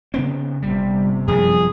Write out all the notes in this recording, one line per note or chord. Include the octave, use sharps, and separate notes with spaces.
C#3 B3 C4
G1 C3 G3
F#2 F3 G3 G#4